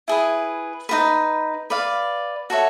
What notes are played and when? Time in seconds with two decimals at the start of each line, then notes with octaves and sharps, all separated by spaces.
0.08 E4 G#4 B4
0.89 D#4 F#4 B4
1.70 B4 D5 F5
2.50 F#4 A4 C#5 E5